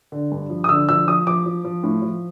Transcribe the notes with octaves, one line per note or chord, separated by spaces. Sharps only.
D3
G2
F3
D#6
D3 E6
F3 E6
F3 D#6
F3 D6
F3
F3
A2
F3